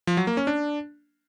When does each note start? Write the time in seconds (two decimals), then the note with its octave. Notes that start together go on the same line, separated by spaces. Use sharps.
0.07 F3
0.17 F#3
0.27 A#3
0.37 C#4
0.47 D4